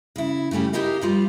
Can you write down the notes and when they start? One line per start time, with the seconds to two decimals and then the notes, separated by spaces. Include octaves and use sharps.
0.16 C#3 E4
0.51 C#3 G3 A3 C#4 G4
0.73 D#4 E4 G4 A#4 D#5 F5
1.01 F3 G3 F4